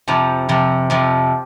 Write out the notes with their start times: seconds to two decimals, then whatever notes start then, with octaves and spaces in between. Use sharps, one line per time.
0.08 F2 C3 F3
0.49 F2 C3 F3
0.90 F2 C3 F3